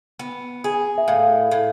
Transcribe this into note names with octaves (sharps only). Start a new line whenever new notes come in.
B3
G#4
E5
A2 F5
A2